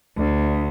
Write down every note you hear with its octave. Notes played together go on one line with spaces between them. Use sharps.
D2